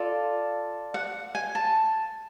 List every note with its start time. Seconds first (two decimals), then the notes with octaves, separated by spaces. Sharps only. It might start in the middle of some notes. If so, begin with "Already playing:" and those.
Already playing: F4 A4 D5
0.94 F#5
1.35 G#5
1.55 A5